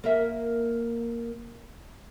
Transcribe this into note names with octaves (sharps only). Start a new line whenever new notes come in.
A#3 A#4 E5